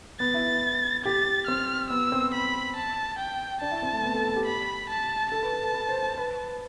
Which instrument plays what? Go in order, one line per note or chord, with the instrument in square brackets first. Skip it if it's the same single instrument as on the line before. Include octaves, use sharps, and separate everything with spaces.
[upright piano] B3 [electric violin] A6
[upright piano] E4
[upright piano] G4 [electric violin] A6
[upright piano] C4 [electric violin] F6
[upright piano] B3 [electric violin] E6
[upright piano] C4
[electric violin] B5
A5
G5
[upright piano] D4 [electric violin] A5
[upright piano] E4
C4
A3
B3
A4
A4
G4
[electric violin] B5
A5
[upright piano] A4 [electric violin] A5
[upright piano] B4
A4
B4
B4
C5
C5
B4